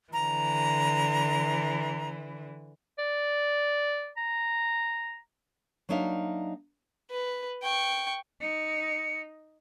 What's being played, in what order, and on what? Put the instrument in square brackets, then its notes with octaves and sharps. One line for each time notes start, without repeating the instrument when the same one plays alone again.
[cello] D3 E3 [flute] A#5
[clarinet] D5
A#5
[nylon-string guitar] F#3 A#3 D4 D#4 E5 F5
[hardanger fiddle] B4
G5 C#6
[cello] D#4 [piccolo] C#7